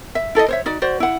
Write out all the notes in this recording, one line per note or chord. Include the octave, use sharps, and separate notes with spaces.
E5
E4 A4 D5 D#5
C5 C#5 E5
D#4 F#4 D5
F#4 C5 D5
E4 F#5